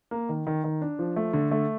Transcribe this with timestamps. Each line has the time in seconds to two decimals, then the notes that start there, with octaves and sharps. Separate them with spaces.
0.11 A#3
0.29 D#3
0.47 D#3
0.64 D#3
0.82 D4
0.99 F3
1.16 A3
1.33 D3
1.51 A3